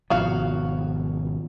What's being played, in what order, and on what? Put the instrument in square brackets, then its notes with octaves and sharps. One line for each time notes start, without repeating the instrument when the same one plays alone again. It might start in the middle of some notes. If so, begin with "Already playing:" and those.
[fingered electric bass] G#1 B2 F3 [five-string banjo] F#4 F5